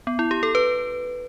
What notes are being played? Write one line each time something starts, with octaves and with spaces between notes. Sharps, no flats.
B3
E4
G4
A4
B4